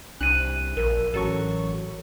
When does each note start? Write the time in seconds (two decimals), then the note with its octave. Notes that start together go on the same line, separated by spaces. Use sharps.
0.21 C2 D4 F#6 D#7
0.77 A#1 A#4
1.14 A1 F#3 A4 C#6